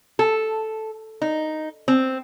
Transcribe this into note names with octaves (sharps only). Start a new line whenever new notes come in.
A4
D#4
C4